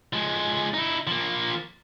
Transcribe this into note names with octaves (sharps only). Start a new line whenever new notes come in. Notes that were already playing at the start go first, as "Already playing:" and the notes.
F3 G#3
D#4 E4
F3 A#3